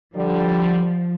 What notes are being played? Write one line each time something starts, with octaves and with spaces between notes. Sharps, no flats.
D3 F3 G3